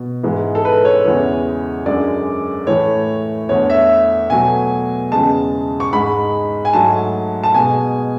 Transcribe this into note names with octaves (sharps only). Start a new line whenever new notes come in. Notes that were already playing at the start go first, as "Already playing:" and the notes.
Already playing: B2
G#2 E3 G#3
A4
B4
C#5
E2 C#3 E3 G#3
F#2 D3 G#3 D5
A2 E3 A3 C#5
E2 D3 A3 C#5
E5
B2 F#3 A3 G#5
E2 C#3 G#3 A5
C#6
G#2 G#3 B5
G#5
G#2 F#3 A3 A5
A5
B2 G#3 G#5